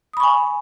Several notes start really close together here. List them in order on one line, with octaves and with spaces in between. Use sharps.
D#6 B5 C#6 G#5